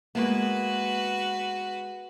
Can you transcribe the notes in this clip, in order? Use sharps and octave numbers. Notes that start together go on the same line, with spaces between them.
G#3 A#3 B3 F#4 B4